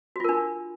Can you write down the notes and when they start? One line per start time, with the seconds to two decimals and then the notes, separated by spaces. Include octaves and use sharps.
0.16 F#4
0.20 F4
0.24 A#4
0.29 D4